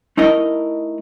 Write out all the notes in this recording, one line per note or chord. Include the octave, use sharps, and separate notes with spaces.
A3 D#4 E4 A#4 D#5